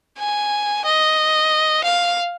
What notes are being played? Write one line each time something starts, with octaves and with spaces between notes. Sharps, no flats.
G#5
D#5
F5